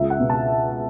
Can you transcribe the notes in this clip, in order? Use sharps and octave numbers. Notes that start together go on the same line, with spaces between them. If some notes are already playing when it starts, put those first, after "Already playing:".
Already playing: C#2 E5
F#5
B2
A5